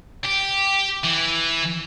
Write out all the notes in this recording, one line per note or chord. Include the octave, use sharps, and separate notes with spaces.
G4
E3